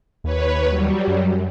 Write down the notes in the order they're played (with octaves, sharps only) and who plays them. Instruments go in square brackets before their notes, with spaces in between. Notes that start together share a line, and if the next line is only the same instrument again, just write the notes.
[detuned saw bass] D#2 [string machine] B4 C#5
[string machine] F#3 G3
[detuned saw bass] F#2